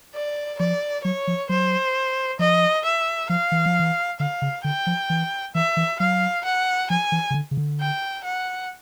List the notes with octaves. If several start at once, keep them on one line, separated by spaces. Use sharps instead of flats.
D5
F3 D5
F#3 C#5
F3
F#3 C5
F3 D#5
E5
F3 F5
E3
F3
E3
D3 F5
C#3
D3 G5
F3
E3
E3 E5
E3
F#3 F5
F#5
F3 G#5
E3
C#3
D3
C#3
D3
G5
F#5